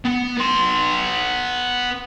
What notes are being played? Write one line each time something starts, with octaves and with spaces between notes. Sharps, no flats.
B3
B3 C6